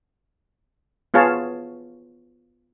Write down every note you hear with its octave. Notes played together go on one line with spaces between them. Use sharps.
B3 F4 G#4 C#5 F5 A5